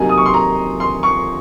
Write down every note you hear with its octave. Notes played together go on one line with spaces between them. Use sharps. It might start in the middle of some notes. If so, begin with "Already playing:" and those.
Already playing: C3 F#3 A#3 D#4 G#5
D#6
C#6
C6
A#5
C6
C#6